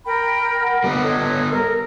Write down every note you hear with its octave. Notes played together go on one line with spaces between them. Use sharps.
A#4 G5 B5
F#5
G3 B3
A4 C#5 D#5
A#4